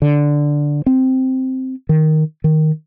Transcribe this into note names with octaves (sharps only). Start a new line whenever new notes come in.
D3
C4
D#3
D#3